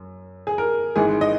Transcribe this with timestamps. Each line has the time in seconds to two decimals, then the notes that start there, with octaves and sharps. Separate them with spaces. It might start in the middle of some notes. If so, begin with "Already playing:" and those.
Already playing: F#2
0.47 G#4
0.58 A#4
0.96 G#1 G#2 E3 G#3 G#4
1.21 D#5